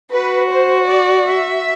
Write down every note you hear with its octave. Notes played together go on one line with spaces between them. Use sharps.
F#4 B4
C5
D5
E5